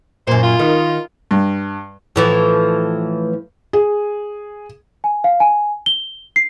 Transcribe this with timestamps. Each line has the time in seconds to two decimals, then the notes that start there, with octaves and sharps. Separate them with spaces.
0.27 F#2 A#2 C5
0.43 F4
0.59 D#3
1.31 G2
2.16 A2 E3 F3
3.73 G#4
5.04 G#5
5.24 F5
5.40 G#5
5.86 G7
6.36 C7